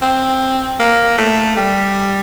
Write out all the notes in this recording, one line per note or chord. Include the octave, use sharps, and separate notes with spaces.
C4
A#3
A3
G3